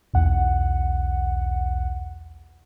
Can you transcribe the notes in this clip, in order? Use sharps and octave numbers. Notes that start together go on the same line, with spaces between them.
B1 E2 F#5